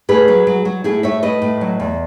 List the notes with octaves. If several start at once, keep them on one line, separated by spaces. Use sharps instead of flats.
A2 G#4 B4
F#3
F#3
F#3
A2 E4 G#4
A2 C#5 E5
A2 B4 D#5
A2
F#3
E2